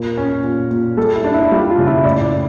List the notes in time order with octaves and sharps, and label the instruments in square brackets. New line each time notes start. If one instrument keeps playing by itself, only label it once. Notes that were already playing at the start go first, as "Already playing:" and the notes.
Already playing: [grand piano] A#2 [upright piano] A#4
[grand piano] C#4
A#2
A#2
[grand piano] G3 [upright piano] A4
[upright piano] E4
[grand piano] D4
[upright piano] E4
[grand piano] G3 [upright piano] F4
[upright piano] F4
[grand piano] C#3
[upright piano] E4
[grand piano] A2 [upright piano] D5
[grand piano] A2